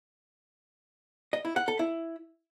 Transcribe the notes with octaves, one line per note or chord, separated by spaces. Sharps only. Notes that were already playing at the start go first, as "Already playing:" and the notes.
D#5
E4
F#5
A4
E4